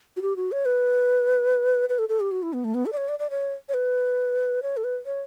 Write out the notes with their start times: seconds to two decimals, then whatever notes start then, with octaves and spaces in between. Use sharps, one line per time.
0.17 F#4
0.22 G4
0.36 F#4
0.52 C#5
0.65 B4
1.89 B4
1.99 A4
2.09 A4
2.20 G4
2.31 F#4
2.43 E4
2.53 B3
2.64 A3
2.74 B3
2.86 A4
2.93 D5
2.97 C#5
3.08 D5
3.19 D5
3.30 C#5
3.69 C#5
3.74 B4
4.63 C#5
4.77 A4
4.84 B4
5.06 C#5